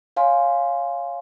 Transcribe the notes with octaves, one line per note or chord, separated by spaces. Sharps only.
C#5 F5 G#5 C6